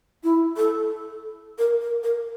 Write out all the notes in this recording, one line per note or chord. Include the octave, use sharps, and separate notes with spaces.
E4
A4
A#4
A#4
A#4